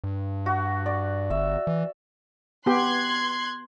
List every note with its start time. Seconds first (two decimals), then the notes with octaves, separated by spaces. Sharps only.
0.04 G2
0.46 F#4
0.86 D5
1.30 G1 E5
1.67 E3
2.66 B3 G4 C6 F#6 G#6